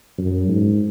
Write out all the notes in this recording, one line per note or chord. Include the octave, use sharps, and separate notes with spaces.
F#2
G#2